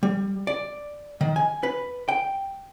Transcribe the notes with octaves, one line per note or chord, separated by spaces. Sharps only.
G3
D5
D#3
G#5
B4
G5